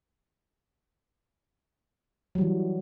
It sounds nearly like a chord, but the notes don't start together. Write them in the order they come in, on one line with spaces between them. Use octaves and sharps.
F#3 G3 E3